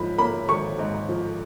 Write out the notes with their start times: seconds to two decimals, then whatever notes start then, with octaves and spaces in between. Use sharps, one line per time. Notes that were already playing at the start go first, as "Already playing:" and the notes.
Already playing: G#2 F3 B5
0.18 A#3 B5
0.49 G#1 C#6
0.79 G#2
1.09 F3